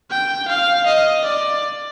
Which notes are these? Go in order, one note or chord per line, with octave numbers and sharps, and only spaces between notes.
G5
F5
D#5
D5